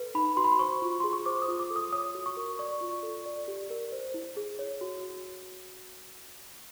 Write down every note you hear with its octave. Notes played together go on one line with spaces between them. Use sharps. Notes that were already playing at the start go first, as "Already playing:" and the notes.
Already playing: A4 B4
D#4 B5
F#4 C6
B5
C6
C5 C#6
F4
G#4 C6
C#6
C5 D6
D#6
F4
D6
A4
D#6
C#5 D#6
F#4
C#6
A#4
D5 C#6
F4
A4
D5
G4
A#4
C5
E4
G#4
C#5
F#4